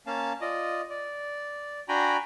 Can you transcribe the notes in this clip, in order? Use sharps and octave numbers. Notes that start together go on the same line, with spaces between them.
A#3 C#4 F5 A5
F4 D5 D#5
D5
D4 F#4 G5 G#5 A#5 B5